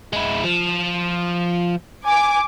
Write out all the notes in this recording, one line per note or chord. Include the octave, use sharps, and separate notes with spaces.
G#3 E4
F3
G#5 D6